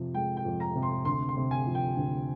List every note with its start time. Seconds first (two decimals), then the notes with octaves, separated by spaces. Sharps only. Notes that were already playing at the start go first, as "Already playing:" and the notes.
Already playing: F2 C3 F3
0.14 G#3 G5
0.37 G5
0.45 F2
0.60 A#5
0.75 C3
0.83 C6
1.05 D2 C6
1.29 C6
1.37 C3
1.51 G#5
1.66 F3
1.75 G5
1.97 D2